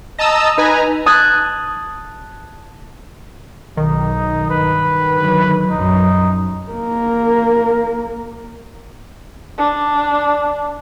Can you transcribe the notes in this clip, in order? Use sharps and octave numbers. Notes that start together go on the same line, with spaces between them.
D#5 A5 A#5 D#6 E6
D#4 B4 G#5 A#5
A5 D#6 F#6 G#6
B1 D#3 D#4
G2 B4
D3 F#3
A#1 F#2 D#4
A#3 A#4
D4